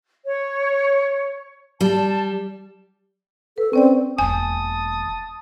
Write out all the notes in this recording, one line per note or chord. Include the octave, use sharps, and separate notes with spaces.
C#5
G3 A5
A4 B4
C4 C#4 D5 G5
E1 D#2 G#5 A5 D#6